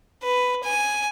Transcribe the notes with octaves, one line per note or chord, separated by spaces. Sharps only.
B4
G#5